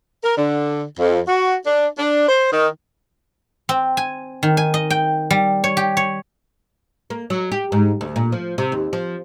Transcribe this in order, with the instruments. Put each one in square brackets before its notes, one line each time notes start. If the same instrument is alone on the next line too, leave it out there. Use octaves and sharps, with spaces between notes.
[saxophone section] A#4
D3
F2
F#4
D4
D4
C5
D#3
[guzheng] C4
G#5
D#3
G#5
D#5
G5
G3
C#5
G4
C#5
[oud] A#3
F#3
G4
G#2
D2
A#2
F3
C3
D#2
F3